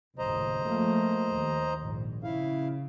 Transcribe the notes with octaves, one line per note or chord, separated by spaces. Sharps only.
F#1 D#2 A2 C5 D#5 A#5
F3 A3 A#3
D#2
A#1 G#2
C#3 E4 F5